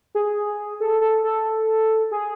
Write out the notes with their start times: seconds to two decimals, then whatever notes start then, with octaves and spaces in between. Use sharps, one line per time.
0.15 G#4
0.80 A4
1.01 A4
1.24 A4
2.11 G#4